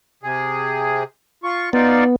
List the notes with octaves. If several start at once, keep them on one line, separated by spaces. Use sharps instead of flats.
C3 G#4
F4 C#6
B3 D#4 F4 D5